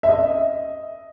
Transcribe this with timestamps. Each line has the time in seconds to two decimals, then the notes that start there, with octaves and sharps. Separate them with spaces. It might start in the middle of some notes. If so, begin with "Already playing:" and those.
0.03 E5
0.09 D#5